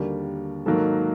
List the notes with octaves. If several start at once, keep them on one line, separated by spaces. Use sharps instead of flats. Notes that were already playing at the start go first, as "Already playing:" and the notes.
Already playing: D#2 D3 G3 A#3 F#4
G#2 D#3 F#3 A#3 A4